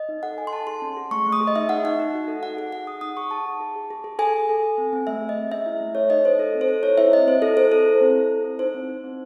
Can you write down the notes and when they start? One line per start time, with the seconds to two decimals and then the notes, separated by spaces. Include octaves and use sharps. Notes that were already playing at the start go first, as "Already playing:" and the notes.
Already playing: D#5
0.09 D#4
0.23 A4 F#5
0.38 A4 G#5
0.47 C6
0.52 A4 A5
0.67 G#4 C6
0.82 C#4
0.97 G#4
1.11 A3 C#6
1.26 A3
1.33 D#6
1.40 G#4
1.47 D#5
1.55 D#4 E5
1.69 D#4 F#5
1.84 D#4 F#5
2.00 D#4
2.14 F#4
2.28 A4
2.43 D#4 F#5
2.57 G#4 F#5
2.72 G#4 F#5
2.87 G#4 D#6
3.01 D#4 D#6
3.17 G#4 C#6
3.31 G#4 A5
3.46 G#4
3.60 G#4
3.76 G#4
3.90 G#4
4.04 G#4
4.19 A4 G#5
4.34 A4
4.49 A4
4.63 A4
4.78 C4
4.93 C4
5.07 A3 E5
5.21 G#4
5.29 D#5
5.36 G#4
5.51 C#4 E5
5.66 E4
5.81 A3
5.95 A4 C#5
6.10 D#4 D#5
6.24 A4 C5
6.39 D#4 A4
6.55 C4
6.61 C5
6.69 A4
6.83 E4 C#5
6.98 E4 E5
7.13 C4 D#5
7.27 C4 C5
7.42 E4 A4
7.56 G#4 C5
7.72 A4
7.85 E4
8.01 C4
8.15 E4
8.30 E4
8.45 A4
8.59 D#4 C5
8.74 C4
8.89 D#4
9.04 C4